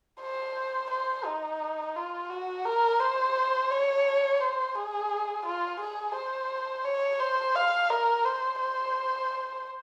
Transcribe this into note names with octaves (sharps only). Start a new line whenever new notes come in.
C5
C5
D#4
F4
F#4
A#4
C5
C#5
C5
G#4
F4
G#4
C5
C#5
C5
F5
A#4
C5
C5